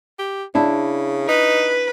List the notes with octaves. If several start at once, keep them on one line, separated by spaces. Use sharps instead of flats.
G4
C#3 D4 E4
D#4 B4